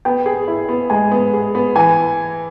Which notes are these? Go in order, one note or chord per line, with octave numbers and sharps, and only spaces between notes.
B3 G5
G#4
E4
B3
G#3 G#5
B3
G#4
B3
E3 G#5